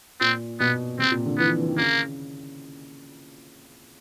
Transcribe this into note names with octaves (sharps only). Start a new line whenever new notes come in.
A#2 C4
B2 B3
C3 C4
A#2
D3
E3 B3
F3
E3
D#3
C#3 A#3